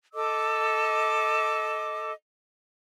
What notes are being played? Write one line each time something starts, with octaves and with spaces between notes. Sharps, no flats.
A4 D#5 D6 E6